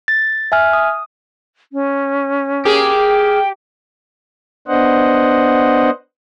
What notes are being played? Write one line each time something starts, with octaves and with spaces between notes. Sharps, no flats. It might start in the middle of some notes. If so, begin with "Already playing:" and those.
A6
E5 G#5 F6
D#6
C#4
A#3 G4 G#4
G5
B3 D4 C5 D#5 F#5